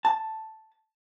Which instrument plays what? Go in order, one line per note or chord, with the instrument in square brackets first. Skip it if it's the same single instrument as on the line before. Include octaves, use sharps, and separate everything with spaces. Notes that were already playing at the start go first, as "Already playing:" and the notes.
[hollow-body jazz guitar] A5